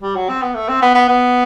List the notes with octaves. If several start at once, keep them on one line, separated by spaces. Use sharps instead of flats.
G3
F#3
C4
B3
A3
C4
B3
B3
B3